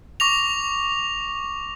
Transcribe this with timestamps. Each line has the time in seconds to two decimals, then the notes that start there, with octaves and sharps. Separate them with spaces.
0.20 C#6 D6 A#6 F7